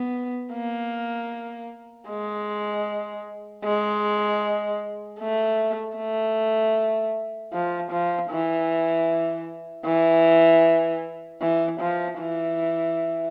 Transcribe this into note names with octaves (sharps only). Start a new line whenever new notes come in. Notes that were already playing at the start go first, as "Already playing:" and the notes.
Already playing: B3
A#3
G#3
G#3
A3
A3
F3
F3
E3
E3
E3
F3
E3